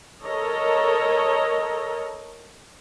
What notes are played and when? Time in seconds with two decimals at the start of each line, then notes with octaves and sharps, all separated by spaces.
0.23 A4 A#4 C#5 D#5 A#5